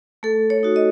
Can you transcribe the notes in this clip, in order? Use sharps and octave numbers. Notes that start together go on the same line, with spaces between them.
A3 A4
C#5
D#4 F#4
D#5